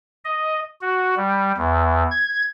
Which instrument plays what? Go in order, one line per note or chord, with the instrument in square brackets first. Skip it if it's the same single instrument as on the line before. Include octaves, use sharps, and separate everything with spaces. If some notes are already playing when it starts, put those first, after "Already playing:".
[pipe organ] D#5
F#4
G3
E2
G#6